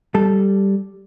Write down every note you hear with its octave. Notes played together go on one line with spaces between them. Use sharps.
G3 A4